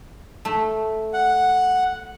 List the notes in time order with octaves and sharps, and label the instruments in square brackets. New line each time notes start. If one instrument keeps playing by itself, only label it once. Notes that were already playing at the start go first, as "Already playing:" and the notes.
[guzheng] A3
[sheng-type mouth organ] F#5